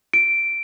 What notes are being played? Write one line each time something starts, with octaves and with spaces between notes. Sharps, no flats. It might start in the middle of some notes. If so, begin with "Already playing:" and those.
D7